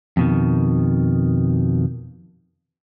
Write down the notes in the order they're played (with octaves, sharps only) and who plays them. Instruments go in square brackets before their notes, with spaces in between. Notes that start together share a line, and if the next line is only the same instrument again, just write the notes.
[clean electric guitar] F2 B2 D#3